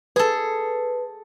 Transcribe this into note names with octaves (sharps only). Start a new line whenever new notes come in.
G#4 A4 B4